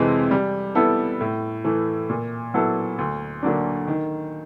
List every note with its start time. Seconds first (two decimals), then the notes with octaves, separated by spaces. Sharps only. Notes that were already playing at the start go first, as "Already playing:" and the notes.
Already playing: F2 C3 E3 G#3 C4
0.31 G3
0.75 B3 E4 A4
1.21 A2
1.65 E3 A3
2.10 A#2
2.54 F#3 B3 E4 A4
2.99 D2
3.43 D3 F#3 A#3 D4
3.87 D#3